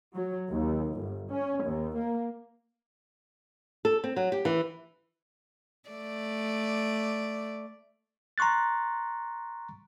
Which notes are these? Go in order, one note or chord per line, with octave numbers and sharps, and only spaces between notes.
F#3
D#2
G1
C#4
D#2
A#3
A4
C4
F#3
G4
E3
A3 D5
A#5 C6 C#6 F#6 A6